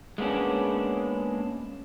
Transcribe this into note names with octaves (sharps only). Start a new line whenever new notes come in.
G#3 A#3 B3 C#4 D4